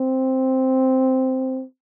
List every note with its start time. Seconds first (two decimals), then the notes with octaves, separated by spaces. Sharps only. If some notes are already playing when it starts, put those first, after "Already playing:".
Already playing: C4